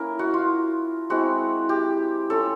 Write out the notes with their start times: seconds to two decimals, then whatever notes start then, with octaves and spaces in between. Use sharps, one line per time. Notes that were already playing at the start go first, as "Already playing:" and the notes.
Already playing: A#3 C#4 E4 A#4
0.19 F#4
0.34 F4
1.10 G#3 C4 E4 F#4
1.69 G4
2.30 A3 C#4 F4 A4